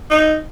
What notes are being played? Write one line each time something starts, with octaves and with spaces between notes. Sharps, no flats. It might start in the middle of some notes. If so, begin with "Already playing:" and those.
D#4